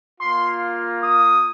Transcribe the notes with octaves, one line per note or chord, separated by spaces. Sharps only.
A#3 F4 C6
D#6